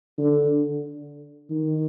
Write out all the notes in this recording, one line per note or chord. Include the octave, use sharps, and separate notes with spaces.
D3
D#3